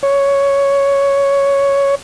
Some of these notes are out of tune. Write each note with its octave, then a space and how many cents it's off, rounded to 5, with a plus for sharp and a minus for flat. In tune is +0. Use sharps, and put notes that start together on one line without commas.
C#5 +5